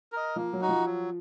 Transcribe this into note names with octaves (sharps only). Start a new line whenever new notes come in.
A#4 D#5
F3 A#3
F#3
D#4 F#4
F3
F#3